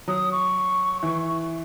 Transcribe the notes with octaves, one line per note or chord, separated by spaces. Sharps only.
F#3 D#6
C#6
E3